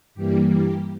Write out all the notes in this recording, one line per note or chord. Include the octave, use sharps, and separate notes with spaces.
G2 E3 G3 A#3 G4
G4